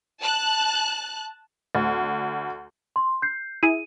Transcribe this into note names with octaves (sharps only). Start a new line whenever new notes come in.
A5 F#6
D2
C6
G6 C7
E4 G#4 D#7